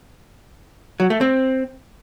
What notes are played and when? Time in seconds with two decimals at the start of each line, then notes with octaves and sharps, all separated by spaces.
1.00 F#3
1.10 A3
1.21 C4